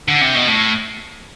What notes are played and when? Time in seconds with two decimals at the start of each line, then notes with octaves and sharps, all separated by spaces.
0.08 D3
0.21 C3
0.35 B2
0.47 A2